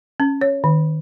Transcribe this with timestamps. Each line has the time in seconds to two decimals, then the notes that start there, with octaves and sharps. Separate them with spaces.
0.20 C#4
0.41 C#5
0.64 D#3